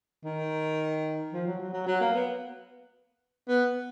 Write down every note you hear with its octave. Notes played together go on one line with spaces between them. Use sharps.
D#3
F3
F#3
F#3
F#3
F#3
A#3
B3
B3